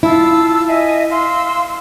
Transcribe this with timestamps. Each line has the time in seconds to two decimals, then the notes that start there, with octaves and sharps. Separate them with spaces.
0.03 E4 F4 A5 E6
0.68 D#5 E5 G#5
1.10 F5 C6 E6